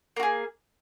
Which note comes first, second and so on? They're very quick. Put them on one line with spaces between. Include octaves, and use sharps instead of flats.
A#3 F#4 G#4